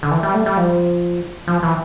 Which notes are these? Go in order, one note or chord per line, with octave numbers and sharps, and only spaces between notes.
D3
E3
G3
A3
G3
F3
F3
E3